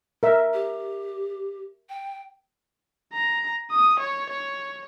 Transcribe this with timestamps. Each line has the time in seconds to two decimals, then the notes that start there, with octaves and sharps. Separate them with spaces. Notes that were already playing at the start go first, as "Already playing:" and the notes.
0.23 A#4 E5
0.54 G4
1.89 G5
3.13 A#5
3.71 D#6
4.00 C#5
4.30 C#5